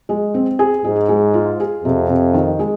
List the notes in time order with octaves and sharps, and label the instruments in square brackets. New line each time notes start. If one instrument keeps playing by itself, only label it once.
[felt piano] G#3
C4
G#4
[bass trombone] G#2 [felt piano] G#3
[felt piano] G#3
F4
G#4
[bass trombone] F2 [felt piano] C3
[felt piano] C3
D#3
G#3